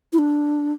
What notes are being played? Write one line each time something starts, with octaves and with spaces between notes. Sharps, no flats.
E4
D4